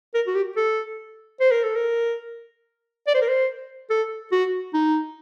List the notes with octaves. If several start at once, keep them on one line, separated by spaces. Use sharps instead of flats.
A#4
F#4
G4
A4
C5
A#4
A4
A#4
D5
C5
A#4
C5
A4
F#4
D#4